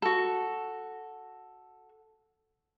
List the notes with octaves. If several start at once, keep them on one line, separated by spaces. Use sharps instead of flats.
F#4 A4